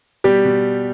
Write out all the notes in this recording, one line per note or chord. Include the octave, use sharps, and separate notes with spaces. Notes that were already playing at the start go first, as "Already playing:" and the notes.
B2 G3 G4
B2